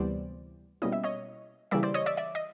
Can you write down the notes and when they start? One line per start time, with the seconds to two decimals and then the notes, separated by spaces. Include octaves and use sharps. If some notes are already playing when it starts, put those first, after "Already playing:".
Already playing: D2 C3 E3 G3 B3 C5 D5
0.82 B2 G3 A#3 C#4 E4 D#5
0.92 E5
1.04 C#5 D#5
1.71 C#3 E3 G3 A#3 D5 E5
1.83 C5 D5
1.94 C#5 D#5
2.06 D5 E5
2.17 D5 E5
2.35 D#5